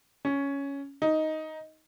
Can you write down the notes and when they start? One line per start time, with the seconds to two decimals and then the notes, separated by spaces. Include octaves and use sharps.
0.25 C#4
1.02 D#4